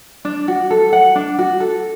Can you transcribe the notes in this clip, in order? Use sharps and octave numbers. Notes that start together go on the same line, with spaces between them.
D4
F#4
A4
F#5
D4
F#4
A4